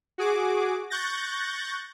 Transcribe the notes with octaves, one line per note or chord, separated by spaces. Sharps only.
F#4 G#4 D6
C#6 F#6 G6 A6 A#6